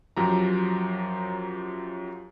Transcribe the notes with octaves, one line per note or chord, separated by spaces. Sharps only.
F#2 F3 F#3 G4 A#5